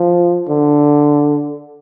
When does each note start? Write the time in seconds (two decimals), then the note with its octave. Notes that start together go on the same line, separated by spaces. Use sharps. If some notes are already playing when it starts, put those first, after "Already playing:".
Already playing: F3
0.49 D3